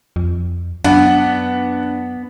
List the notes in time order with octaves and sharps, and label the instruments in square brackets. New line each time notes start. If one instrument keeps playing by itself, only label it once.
[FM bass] F2
[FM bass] F#2 [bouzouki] B3 [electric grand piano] D4 [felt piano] F#5